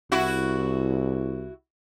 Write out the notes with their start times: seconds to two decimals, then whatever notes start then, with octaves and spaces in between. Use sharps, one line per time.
0.12 C2 E4 F#4